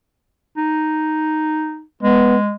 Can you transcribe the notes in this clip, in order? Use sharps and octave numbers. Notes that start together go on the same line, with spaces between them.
D#4
G#3 B3